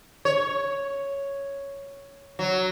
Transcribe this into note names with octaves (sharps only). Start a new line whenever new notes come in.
C#5
F#3